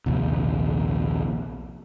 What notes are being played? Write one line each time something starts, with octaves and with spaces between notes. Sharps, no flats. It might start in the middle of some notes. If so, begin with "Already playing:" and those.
A#1 D#2 C3